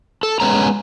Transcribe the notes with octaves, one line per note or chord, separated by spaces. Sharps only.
A4
G#3 B3 C#4 A#5